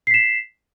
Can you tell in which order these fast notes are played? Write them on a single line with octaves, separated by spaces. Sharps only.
C7 B6 E7